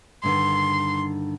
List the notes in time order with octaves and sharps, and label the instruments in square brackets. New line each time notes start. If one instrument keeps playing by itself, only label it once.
[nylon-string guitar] G2 D3 D#3 [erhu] C6